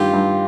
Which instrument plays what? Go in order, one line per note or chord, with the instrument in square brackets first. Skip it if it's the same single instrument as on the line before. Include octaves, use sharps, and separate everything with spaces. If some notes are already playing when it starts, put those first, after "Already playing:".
Already playing: [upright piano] G2 D#3 [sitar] F4 G4
[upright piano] G2